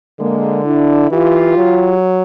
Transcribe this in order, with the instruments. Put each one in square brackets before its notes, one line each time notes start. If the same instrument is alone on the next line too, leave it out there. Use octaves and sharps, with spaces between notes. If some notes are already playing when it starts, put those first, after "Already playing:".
[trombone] D3 [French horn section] G#3 A#3
[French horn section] D4 E4
[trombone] E3 [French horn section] F4 G4
[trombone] F#3